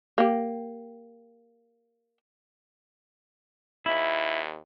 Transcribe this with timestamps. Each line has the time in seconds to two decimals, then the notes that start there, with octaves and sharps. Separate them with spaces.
0.18 A#3 G4
3.86 D#2 E4